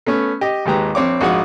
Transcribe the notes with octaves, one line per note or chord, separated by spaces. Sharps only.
A3 B3 C#4
G4 D#5
G#1 D#2 G#3 G4 B4 A#5
A#1 C4 C#5 D6
A#1 G#2 F#4 G#4 F#5 D#6